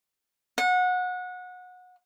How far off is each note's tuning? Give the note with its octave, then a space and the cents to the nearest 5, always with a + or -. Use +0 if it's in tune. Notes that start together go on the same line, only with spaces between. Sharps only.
F#5 -25